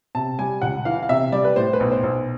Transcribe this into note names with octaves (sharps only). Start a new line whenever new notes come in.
C3 A5
G3 G#5
C#2 F#5
E3 F5
F5
C3 E5
G3 D5
B4
A2 C5
B4
B1
C5
B1